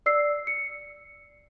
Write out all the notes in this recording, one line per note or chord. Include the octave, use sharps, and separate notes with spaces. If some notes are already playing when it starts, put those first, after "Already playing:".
D5 E6 C7
C#7